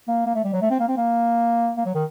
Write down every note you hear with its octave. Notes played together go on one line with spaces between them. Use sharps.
A#3
A#3
A3
G3
F#3
A3
C4
A#3
C4
A#3
A#3
F#3
D#3